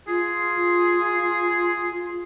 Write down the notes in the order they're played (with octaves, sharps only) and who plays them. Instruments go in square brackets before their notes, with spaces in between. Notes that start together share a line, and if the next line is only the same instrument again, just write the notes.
[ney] F4 [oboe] G#4